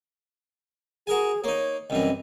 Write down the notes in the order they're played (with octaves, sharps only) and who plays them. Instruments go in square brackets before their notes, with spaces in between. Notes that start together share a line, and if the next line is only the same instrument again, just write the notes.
[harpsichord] F#4 A#4 G#5 [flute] G#4
[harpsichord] A#3 D#4 [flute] C#5
[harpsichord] C2 F#2 E3 [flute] D#5